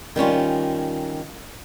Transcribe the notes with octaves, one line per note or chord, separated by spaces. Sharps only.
D#3 G3 C#4 F4